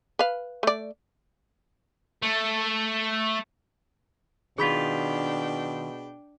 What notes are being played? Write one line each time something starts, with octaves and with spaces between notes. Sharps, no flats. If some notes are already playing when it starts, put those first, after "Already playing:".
B4 F5
A3 D5
A3
B2 D#3 D4 F4 G#4 G5 B5 B6